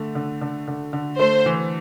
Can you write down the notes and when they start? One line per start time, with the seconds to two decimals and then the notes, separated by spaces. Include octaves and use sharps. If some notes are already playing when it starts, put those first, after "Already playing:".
Already playing: D3 A3
0.15 D3
0.41 D3
0.68 D3
0.93 D3
1.19 A3 C5
1.46 E3